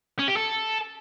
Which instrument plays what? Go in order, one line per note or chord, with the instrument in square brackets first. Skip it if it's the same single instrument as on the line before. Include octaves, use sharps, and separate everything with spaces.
[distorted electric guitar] C#4
G4
A4